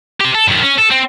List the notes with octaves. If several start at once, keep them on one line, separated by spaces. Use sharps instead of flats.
G4 C6
A4
F#2 D#3
C#4
A4
C4